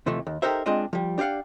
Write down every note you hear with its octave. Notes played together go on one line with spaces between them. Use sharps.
D#2 C3 E3 F3 A3
D#2
D#4 G4 A4 A#4 C5 E5
G#3 C4 D4 F4 D#5
F3 G3
D4 G4 D5 F5 F#5